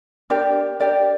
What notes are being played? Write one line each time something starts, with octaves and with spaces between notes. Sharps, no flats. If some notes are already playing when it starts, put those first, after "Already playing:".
D4 G4 A#4 D5
D4 G4 A#4 D5